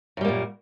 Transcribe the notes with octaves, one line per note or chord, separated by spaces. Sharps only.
F#2 A#2 G3 A#3